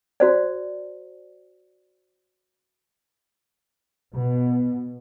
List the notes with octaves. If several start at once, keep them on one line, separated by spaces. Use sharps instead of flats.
F#4 C5 D5
B2